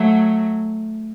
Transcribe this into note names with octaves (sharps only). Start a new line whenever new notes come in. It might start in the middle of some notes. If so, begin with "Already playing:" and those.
Already playing: F#3 A3